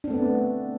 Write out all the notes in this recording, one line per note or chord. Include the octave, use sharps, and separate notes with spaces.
A3 B3 C4 D4